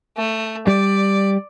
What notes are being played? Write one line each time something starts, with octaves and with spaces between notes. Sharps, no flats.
A3
G3 D5